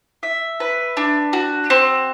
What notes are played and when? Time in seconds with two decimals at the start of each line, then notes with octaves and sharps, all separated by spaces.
0.23 E5
0.60 B4
0.97 D4
1.33 F#4
1.70 C4